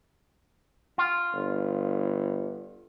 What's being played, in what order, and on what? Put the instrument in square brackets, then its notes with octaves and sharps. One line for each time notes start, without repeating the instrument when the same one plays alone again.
[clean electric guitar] F4
[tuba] G1